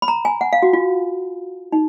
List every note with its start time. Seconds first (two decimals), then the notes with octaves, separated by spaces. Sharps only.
0.02 B5
0.08 A#5
0.25 G#5
0.41 F#5
0.53 F5
0.63 F#4
0.73 F4
1.72 D#4